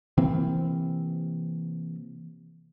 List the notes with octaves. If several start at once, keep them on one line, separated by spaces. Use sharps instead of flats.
C3 E3 A#3 C4